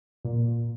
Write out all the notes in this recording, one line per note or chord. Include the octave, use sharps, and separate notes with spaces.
A#2